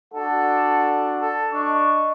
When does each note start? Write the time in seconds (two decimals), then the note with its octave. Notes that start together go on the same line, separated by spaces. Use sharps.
0.14 D4 F#4 A4 F#5
1.22 A4
1.53 D4 D#5 C#6